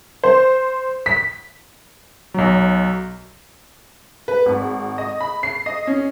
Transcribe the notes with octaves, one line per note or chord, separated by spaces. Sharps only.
C5
B6
B1 F#3
B4
G#1
D#5
B5
C7
D#5
C#4